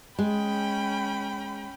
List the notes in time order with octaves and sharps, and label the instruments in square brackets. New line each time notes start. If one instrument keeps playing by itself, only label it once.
[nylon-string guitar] G#3 [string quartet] C#4 G5 B5